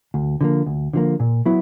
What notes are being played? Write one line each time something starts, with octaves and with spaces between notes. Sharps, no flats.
D2
D3 F3 A#3
D2
D3 F3 A#3
A#2
F#3 B3 E4